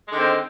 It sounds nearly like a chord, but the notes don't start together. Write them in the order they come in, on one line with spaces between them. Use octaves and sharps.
G#3 D3 D#3 C4